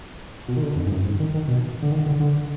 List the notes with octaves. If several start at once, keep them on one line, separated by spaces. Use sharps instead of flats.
B2
D#3
D3
F2
G#2
F#2
G#2
D#3
D#3
B2
D3
D#3
D3
D3